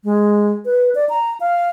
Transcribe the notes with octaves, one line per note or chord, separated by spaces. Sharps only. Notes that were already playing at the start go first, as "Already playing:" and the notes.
G#3
B4
D5
A#5
F5